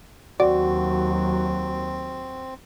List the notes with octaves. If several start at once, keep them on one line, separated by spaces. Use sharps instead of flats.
D#2 F#3 C4 F#4 D5